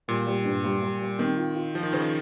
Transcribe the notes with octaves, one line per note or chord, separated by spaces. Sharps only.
A#2 G3
G3
G2
G3
G3
G3
D#3 C4
F4
F4
F3 F4
D#3
C#3 C5
D#3